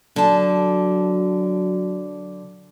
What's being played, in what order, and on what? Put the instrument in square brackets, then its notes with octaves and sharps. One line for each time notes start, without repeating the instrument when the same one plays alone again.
[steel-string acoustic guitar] D3 A5 [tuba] F#3